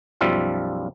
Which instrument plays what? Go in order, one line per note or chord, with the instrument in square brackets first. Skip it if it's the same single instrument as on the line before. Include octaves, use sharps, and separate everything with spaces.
[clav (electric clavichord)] B1 F#2 F3 G3 F4 E5